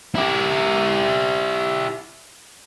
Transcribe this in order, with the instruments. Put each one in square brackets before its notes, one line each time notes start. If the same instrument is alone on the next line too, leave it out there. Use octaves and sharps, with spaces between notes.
[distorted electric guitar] E4 G4